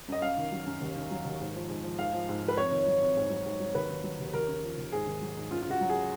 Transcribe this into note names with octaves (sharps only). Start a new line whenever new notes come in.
F#2 D#5
F#2 F5
D#3
F#3
F#2
D#2
D#3
F#3
D#2
G#2
F3
G#2
F3
G#2 F5
F3
G#2
F3
B4
F2 C#5
D#3
F#3
F2
G#2
F#3
G#2
F#3
D#2 B4
D#3
F#3
D#2
D#2 A#4
C#3
F3
D#2
G#2 G#4
D#3
F#3
G#2
F#2 F4
F4
C#3 F#4
F#3
G#4